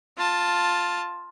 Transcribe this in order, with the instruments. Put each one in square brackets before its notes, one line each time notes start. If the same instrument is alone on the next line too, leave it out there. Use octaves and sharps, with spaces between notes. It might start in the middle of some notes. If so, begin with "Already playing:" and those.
[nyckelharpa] F4 A5